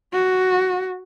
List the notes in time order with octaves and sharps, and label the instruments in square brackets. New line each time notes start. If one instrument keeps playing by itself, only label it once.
[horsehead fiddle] F#4